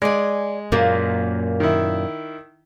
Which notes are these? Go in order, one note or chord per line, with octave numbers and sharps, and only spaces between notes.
G#3 D5 G#5
F#2 A#2 A#3
D#3 E4